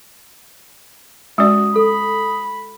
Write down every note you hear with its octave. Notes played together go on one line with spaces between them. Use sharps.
G#3 C#4 F#4 D5 D#6
A4 B5